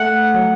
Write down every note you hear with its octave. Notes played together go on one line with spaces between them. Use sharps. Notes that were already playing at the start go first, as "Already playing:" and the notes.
Already playing: A3 F#5
F#3